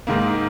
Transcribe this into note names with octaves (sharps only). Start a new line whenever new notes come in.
G#2 D#3 A#3